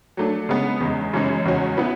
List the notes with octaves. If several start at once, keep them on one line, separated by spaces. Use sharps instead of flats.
F#3 A3 D4
C#3 G#3 B3
E2 C#3 G#3
F#2 C#3 E3 G#3 C#4
E2 C#3 G#3 C#4 F#4
B3 E4 B4